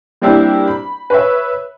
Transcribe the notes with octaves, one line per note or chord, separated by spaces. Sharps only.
G3 A#3 C4 D4 E4 G4
B5
B4 C#5 E5